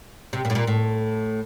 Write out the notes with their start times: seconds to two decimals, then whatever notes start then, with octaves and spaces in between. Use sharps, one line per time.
0.33 C3
0.45 A#2
0.50 A2
0.55 A#2
0.67 A2